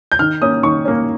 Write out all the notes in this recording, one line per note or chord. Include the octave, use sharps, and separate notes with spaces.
G6
D#3 F6
A#3 C#4 D#6
D#3 C#6
A#3 C#4